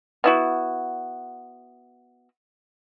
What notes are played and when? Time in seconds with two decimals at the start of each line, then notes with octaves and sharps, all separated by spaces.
0.24 B3 E4 F#4